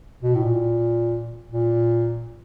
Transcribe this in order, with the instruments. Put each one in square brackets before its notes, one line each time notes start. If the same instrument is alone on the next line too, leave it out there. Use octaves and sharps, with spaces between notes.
[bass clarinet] B2
A2
A#2
A#2